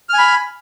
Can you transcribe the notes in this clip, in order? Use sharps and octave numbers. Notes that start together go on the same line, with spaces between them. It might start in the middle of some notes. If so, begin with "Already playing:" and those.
G#5 B5 F6